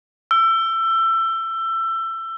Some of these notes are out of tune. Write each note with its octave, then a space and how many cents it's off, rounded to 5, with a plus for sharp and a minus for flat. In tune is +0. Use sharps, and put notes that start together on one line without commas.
E6 +25